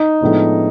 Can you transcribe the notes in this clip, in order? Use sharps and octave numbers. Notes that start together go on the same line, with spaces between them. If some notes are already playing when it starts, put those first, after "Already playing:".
Already playing: D#4
A2 F3 G#3 B3 D4